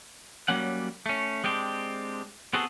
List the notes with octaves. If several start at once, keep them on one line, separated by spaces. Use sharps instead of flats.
F#3 G3 A#3 C#4 F#5
A3 C#4
G#3 C4 D4 G4
B3 C4 F#4 G#4 A4